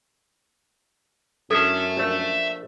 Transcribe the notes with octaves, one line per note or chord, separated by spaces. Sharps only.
F#2 C#4 D4 E4 A4 E5 A5
A#1 A3